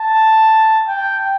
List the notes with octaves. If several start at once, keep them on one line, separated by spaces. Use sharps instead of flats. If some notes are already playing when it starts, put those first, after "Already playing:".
Already playing: A5
G5